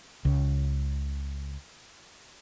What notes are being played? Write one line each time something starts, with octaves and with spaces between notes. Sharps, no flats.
C#2 C#3